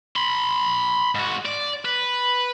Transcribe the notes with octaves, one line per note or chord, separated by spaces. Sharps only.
B5 C6
G#2 F#4
D5
B4